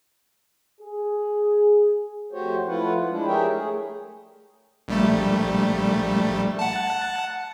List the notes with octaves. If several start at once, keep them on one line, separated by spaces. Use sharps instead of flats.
G#4
F2 A3 F#4 G4 C5 C#5
F3 A3 E4 F4 B4 F#5
F3 G#3 D4 E4
G4 G#4 A#4 C#5 E5 G5
A3 G#4
A#1 G3 A3
F#5 A5